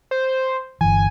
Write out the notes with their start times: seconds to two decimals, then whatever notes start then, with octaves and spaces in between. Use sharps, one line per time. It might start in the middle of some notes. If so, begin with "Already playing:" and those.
0.11 C5
0.81 G1 E3 G#5